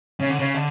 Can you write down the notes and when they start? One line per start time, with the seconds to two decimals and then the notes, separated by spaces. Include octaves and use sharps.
0.20 C#3
0.29 D3
0.39 C#3
0.54 D3